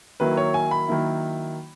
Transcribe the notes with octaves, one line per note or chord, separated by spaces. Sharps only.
D#3 F#3 A#3 E4 B4
C#5
G#5
B5
D#3 F#3 A#3 E4